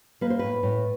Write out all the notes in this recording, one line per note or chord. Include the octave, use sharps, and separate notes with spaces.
A#3 B4
C5
A2 B4
A2